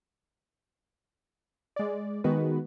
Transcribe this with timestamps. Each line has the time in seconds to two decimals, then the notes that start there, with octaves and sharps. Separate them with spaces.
1.76 G#3 D5
2.24 D#3 G#3 B3 F#4 B4